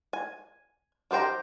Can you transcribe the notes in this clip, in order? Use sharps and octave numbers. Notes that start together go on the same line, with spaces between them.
G#5
D#3 G4 C5 G5 A#5